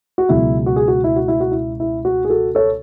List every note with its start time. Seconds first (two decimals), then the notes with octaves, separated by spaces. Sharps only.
0.18 F#4
0.29 C#2 B2 F#3 E4
0.66 F#4
0.76 G#4
0.88 F#4
1.04 E4
1.16 F#4
1.28 E4
1.41 F#4
1.52 E4
1.80 E4
2.05 F#4
2.25 G#4
2.30 F#4 A4
2.55 A4 C#5